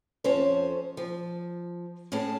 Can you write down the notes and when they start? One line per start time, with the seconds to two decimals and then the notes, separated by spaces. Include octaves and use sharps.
0.24 F2 F3 C#4 A4 C5 C#5
0.97 F3
2.12 A2 C#4 G#4 A5